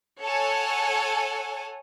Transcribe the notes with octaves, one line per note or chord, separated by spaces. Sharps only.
A4 C#5 F#5 G#5